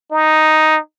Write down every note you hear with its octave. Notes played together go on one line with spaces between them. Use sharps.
D#4